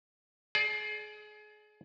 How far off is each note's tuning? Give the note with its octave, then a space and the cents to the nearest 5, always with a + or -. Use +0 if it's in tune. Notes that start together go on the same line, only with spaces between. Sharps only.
G#4 +30 D5 +0